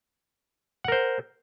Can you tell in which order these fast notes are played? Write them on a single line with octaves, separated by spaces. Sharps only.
F#5 A#4 C5